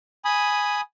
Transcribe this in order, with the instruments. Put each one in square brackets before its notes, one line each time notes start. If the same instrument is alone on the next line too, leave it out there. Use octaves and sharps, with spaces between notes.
[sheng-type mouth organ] G#5 B5 D#6